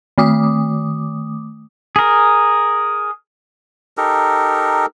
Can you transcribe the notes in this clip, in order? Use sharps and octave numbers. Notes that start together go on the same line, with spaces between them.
D#3 A3 D6 D#6
G#4 A#4
D#4 G4 A4 A#4